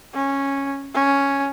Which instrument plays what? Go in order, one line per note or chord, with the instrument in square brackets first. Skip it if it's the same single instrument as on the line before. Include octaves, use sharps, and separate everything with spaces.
[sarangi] C#4
C#4